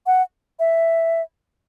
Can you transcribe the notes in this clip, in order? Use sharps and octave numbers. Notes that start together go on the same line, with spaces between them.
F#5
E5